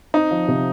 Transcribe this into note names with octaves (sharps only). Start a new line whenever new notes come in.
C4 D#4
F3
C3